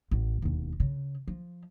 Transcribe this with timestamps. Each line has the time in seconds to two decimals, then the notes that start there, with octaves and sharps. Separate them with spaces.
0.11 A1
0.42 E1 D#2
0.80 C#3
1.28 F3